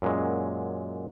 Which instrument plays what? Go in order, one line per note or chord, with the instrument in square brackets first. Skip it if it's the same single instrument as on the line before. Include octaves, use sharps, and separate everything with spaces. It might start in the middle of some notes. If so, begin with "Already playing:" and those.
[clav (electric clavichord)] F#2 A#2 F#3 G#3